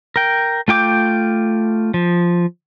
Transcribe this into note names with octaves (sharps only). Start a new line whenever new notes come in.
A#4 G5
A3 F4 G5 D6 G6
F3